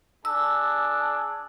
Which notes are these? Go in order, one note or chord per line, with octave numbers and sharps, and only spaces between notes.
D4 G#4 A5 E6